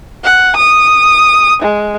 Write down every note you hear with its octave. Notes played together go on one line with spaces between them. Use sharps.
F#5
D#6
G#3